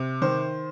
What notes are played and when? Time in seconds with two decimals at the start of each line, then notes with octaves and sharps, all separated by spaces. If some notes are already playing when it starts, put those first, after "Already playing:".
Already playing: C3
0.22 D#3 C5